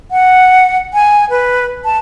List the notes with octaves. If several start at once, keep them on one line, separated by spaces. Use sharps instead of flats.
F#5
G#5
B4
A5